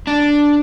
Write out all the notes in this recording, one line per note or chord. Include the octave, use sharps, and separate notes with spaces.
D4